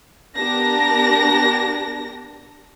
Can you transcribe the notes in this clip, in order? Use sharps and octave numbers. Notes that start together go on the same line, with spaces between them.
B3 D4 G4 A#4 A5 A#6